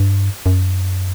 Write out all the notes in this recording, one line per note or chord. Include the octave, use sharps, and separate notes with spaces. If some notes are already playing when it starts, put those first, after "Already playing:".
Already playing: G2
F#2